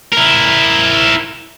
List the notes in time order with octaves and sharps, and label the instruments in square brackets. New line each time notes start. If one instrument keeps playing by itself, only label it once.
[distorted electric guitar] E4 A#4